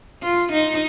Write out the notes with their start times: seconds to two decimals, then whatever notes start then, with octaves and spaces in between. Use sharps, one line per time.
0.22 F4
0.52 D#4